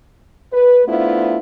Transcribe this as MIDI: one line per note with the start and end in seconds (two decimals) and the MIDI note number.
0.53 0.82 71
0.86 1.38 57
0.86 1.38 59
0.86 1.38 62
0.86 1.38 64
0.86 1.38 65
0.86 1.38 72